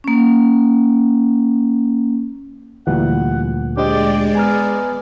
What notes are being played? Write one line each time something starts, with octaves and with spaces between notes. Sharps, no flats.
A#3 C#4
D2 A#2 E3 G3 F#5
G#3 D4 G4 C5 D5 D#5
B3 G#5 A#5 F6